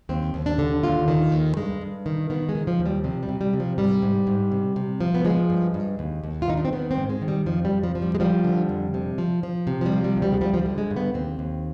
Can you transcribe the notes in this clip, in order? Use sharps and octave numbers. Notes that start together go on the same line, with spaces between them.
D#2 C4
D#2
D4
D3
D#2 F4
D#3
D#2
G2 G#3
G2
D#3
D#3 B3
G#3
D#3
F3
D#2
G3
C3 F3
G3
C3
G3
C3
F3
G#2 G3
G#2
G#2
C3
C3
F3
B3
F3 G#3
G2
G2
D#2
D#2
F4
D#3 D#4
D4
C4
D#3 B3
C4
G#2
G#3
D#3
G3
F2 F3
G3
F2
F3
F3
G3
G#3
F3 G3
D3
F2
C3
F3
F3
C3
F3
G3
F3
G3
D2
G3
G#3
F3 G3
F3
G3
D3
G#3
G2
B3
D#2 C4
D#2